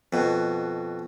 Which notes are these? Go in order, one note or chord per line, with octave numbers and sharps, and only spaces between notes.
F2 B2